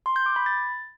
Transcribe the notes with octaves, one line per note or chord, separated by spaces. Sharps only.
C6
G6
D6
B5
A6